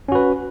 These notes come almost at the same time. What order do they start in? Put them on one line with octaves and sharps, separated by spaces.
C#4 F#4 B4